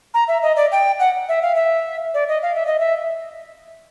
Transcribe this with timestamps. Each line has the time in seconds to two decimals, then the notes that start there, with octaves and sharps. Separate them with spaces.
0.14 A#5
0.28 E5
0.42 D#5
0.56 D5
0.72 G5
1.00 F#5
1.29 E5
1.42 F5
1.55 E5
2.14 D5
2.28 D#5
2.42 F5
2.55 E5
2.66 D#5
2.80 E5